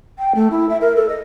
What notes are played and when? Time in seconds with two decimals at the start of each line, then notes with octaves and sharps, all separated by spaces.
0.19 G5
0.35 A3
0.51 E4
0.69 E5
0.81 A#4
0.96 A4
1.09 D#5